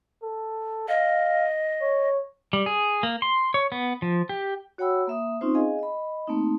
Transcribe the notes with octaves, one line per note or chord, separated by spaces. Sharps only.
A4
D#5 F5
C#5
G3
G#4
A#3
C6
C#5
B3
F3
G4
F#4 C#5 F#5 G5 B5 E6
A#3 E5 D#6
C4 C#4 D#4 F4 C5
G#4 D#5 F5 G#5
D#5 B5
A3 A#3 C4 D#4